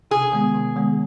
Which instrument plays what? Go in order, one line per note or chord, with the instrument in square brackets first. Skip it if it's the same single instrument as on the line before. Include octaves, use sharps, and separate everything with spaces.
[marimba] C3 [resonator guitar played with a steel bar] G#4
[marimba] D#3 G#3 B3
C3
D#3 G#3 B3